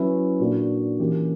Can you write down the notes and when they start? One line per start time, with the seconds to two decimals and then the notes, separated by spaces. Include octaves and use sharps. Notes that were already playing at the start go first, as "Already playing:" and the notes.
Already playing: F#3 C#4 E4 B4
0.40 A#2 A#3 D4 F#4
1.00 E3 A#3 C#4 G4